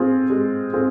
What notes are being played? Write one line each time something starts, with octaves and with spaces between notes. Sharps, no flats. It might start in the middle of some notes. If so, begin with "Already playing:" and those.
Already playing: C4 F4 G#4
G#3
C4 F4 G#4